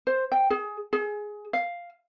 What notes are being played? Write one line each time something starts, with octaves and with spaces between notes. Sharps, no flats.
C5
G5
G#4
G#4
F5